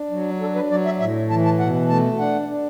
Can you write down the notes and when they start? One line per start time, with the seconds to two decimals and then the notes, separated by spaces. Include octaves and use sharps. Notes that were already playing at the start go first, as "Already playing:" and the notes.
Already playing: D4
0.11 F#3
0.41 D4 A4
0.55 B4
0.71 F#3 D5
0.85 E5
1.00 A2 E5
1.30 E3 A5
1.45 A5
1.59 B2 F#5
1.89 A3 A5
2.19 D4 F#5
2.49 D4